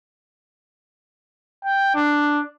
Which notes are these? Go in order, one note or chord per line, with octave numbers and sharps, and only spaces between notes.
G5
D4